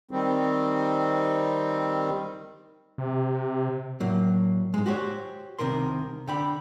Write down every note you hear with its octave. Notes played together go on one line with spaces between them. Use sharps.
D#3 G3 C4
C3
A2 F#3 A#3
G#2 G#3
F#4 G4 C5 C#5
C2 C3 D#3 A#4 C6
D3 G5 B5